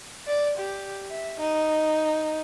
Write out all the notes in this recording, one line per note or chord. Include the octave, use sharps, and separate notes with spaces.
D5
G4
E5
D#4